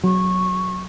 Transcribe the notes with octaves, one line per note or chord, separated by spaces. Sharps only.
F#3 C#6